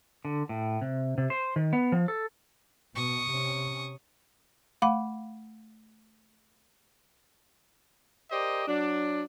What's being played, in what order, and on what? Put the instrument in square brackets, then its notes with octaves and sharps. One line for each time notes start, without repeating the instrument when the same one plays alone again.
[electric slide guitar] D3
A2
C3
C3
C5
D#3
B3
F3
A4
[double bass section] B2 [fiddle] C#6 D#6
[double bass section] C3 C#4
[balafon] A3 F5 F#5 B5 D6
[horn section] G4 A#4 C5 D5 D#5
F#3 D4